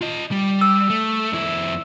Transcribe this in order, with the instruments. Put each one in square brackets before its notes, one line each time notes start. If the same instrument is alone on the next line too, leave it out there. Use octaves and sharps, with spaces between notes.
[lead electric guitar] F4 D#5
G3
[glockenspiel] E6
[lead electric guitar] A3
F2 E4